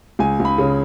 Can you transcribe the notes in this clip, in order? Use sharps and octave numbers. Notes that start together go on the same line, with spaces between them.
C#2 G#5
C#2
B5
C#3